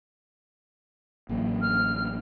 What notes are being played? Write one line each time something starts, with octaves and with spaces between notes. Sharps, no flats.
A1 F#3 A#3
F6